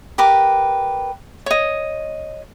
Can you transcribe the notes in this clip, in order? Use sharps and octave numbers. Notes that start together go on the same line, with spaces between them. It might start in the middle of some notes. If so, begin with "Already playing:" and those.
G4 A#4 B4 D6
C#5 D#5